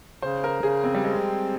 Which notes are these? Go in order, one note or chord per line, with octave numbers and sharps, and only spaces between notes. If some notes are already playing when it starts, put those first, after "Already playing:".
C#3 C5
A#4
C#3 G#4
C4
G3
G#3 C4